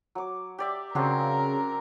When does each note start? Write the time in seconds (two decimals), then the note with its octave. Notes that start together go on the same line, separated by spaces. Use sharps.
0.15 F#3 D6
0.58 G4 D5 E5
0.95 C#3 F#3 C4 D4 A#4